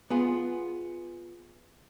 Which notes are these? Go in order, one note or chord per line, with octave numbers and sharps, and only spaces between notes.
B3 F4 G#4